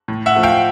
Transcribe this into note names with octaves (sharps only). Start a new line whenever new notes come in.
A2
E5 F#5
F3 A3
F5 G5